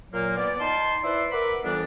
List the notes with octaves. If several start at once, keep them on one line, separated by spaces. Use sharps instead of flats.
A#2 F#3 A#3
B3 D5
D#4 A5 C6
E4 B4 C5 D5 E5 C6
A#4 B4 E5 F#5 B5 D6
F2 E3 G3 B3 D4